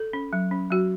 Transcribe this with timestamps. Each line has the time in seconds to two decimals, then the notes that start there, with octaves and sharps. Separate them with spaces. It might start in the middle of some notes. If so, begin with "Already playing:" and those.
Already playing: A4
0.13 C#4
0.33 F#3
0.51 C#4
0.71 F#3 F#4